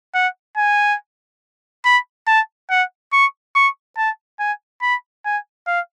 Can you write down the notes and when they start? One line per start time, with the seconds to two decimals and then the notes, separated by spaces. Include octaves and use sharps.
0.14 F#5
0.57 G#5
1.85 B5
2.27 A5
2.70 F#5
3.13 C#6
3.55 C#6
3.97 A5
4.40 G#5
4.82 B5
5.25 G#5
5.67 F5